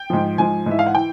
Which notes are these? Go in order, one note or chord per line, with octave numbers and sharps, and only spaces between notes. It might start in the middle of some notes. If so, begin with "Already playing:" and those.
Already playing: G5
G#2 F3
G#2 F3 G#5
G#2 E3 E5
F5
F#5
E3 G5